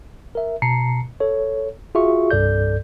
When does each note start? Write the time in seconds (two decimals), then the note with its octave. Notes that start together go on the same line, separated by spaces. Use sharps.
0.35 A#4 E5
0.62 B2 A5 A#5 C7 C#7
1.20 A4 C#5
1.95 F4 F#4 G#4 E5 C#6
2.31 C2 G2 A4 D5 G6